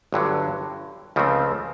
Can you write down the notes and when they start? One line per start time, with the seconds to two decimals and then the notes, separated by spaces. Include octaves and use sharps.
0.12 G1 G2 D3 F#3
1.16 C#2 C#3 F3 A3 C4